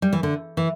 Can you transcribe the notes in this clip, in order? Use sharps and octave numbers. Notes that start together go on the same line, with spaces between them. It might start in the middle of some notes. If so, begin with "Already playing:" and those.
G3
E3
D3
E3